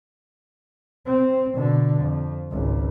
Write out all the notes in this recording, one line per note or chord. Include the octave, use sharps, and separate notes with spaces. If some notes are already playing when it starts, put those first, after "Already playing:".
C4
B2 D3
F2
G#1 C#2